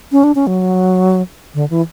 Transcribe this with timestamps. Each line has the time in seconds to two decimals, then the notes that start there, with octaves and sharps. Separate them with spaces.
0.12 C#4
0.24 D4
0.35 C#4
0.47 F#3
1.54 D3
1.70 E3